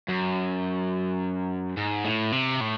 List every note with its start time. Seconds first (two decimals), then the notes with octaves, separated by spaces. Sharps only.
0.08 F#2
1.77 G#2
2.05 A2
2.32 C3
2.61 A2